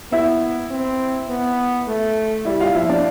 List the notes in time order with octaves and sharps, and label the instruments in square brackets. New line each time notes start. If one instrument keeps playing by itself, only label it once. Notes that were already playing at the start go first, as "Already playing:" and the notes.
[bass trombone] B3 [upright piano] E4 E5
[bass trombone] C4
B3
A3
[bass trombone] G3 [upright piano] E4 E5
[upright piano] F4 F5
[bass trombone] F3 [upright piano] E4 E5
[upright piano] D4 D5